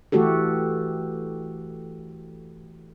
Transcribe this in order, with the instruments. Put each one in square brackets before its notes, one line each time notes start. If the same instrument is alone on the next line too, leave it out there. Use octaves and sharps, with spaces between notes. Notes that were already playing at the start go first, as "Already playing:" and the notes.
[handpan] E3 A3 F#4 G4 A4